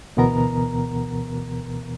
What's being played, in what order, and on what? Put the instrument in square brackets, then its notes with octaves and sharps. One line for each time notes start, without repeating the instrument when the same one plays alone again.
[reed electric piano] D2 B2 E3 B3 A#4 A#5